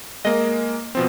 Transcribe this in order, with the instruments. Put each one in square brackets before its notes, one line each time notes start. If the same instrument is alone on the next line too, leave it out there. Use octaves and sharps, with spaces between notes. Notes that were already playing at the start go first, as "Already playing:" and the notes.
[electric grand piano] G#3 A#3 [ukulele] D#5
[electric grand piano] B2 F3 C4